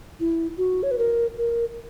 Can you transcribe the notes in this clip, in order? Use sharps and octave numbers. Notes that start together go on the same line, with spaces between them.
E4
F#4
C#5
B4
A#4
A#4